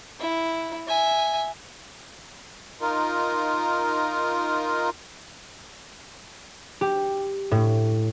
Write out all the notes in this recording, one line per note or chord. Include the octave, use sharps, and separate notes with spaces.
E4
E5 G#5
D#4 F4 A#4
G4
A2